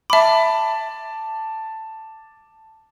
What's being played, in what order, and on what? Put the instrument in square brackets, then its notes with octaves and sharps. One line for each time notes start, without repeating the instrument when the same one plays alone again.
[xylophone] E5 B5 [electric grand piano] A5 D6